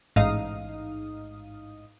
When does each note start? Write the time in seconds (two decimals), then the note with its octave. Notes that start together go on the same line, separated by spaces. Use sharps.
0.16 A1 G#2 D#4 F5 D#6